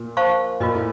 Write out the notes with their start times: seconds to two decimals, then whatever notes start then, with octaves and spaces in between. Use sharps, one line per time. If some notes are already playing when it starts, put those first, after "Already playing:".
Already playing: A#2
0.17 C5 F5 A5 C#6
0.60 A#2 F4 A#4 D#5
0.75 A2